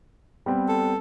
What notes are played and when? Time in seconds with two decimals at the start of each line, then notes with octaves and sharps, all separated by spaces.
0.46 G3 B3 C4
0.69 A4